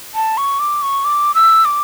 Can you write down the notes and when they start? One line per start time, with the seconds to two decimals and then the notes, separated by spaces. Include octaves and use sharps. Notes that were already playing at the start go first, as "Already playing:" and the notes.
0.15 A5
0.37 C#6
0.60 D6
0.82 C#6
1.05 D6
1.35 E6
1.65 D6